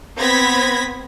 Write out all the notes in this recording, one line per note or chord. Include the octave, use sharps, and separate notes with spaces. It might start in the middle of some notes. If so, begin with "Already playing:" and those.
B3 C4 B5 G#6 A#6 B6